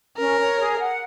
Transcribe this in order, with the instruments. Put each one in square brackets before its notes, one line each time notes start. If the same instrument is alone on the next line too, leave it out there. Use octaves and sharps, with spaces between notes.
[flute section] C#4 [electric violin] A#4
[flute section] C#5
G#4
F#5